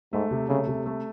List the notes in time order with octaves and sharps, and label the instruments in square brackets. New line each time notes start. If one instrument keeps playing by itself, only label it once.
[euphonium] G#2 [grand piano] A3
[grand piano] C3
[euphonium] C#3 [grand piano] A3
[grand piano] C3
A3